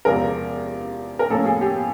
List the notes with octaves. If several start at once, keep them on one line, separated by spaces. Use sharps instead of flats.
E2 C3 F3 G#3 A#4
A#4
A2 F3 A#3 C#4 A4
G#4
G4